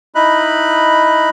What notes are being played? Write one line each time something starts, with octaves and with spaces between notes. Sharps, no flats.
D#4 E4 D#5 B5 F#6